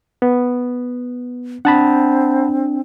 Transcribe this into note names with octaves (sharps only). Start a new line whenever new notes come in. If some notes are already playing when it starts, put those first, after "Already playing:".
B3
C4 D4 F#5 A5 B5